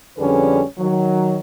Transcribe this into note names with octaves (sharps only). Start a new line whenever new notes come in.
F2 D3 G3 C#4 G#4 B4
D#3 F#3